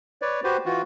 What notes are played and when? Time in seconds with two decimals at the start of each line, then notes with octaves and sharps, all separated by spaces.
0.22 B4 C#5 D5
0.44 F#4 G4 B4 C5
0.65 E3 F4 F#4